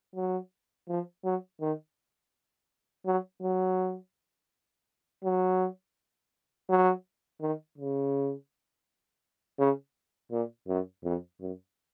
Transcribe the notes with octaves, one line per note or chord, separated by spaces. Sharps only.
F#3
F3
F#3
D#3
F#3
F#3
F#3
F#3
D#3
C#3
C#3
A#2
F#2
F2
F#2